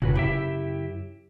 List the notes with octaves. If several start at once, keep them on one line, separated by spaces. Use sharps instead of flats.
F1 A#2 C#3 F#4 B4
F#2 E4 G4 E5